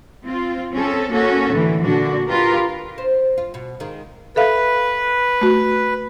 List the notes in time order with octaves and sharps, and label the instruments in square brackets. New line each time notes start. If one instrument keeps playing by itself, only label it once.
[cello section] C4 F4
C4 C#4 A4
A#3 C#4 F#4 A4
A2 D3 E3
A#2 D3 D4 F#4
F4 G4 A#4 B4
[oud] C5
F4
B2
D#3 G#3 F4
[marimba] A4 E5 F5 [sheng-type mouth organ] B4
[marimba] A3 F#4